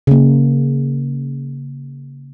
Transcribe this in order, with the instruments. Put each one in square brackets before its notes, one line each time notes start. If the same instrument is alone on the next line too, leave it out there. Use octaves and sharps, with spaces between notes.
[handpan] C#3 A#3